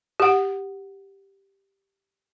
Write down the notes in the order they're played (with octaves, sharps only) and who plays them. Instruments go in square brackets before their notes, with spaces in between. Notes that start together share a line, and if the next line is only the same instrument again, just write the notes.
[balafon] G4 F#5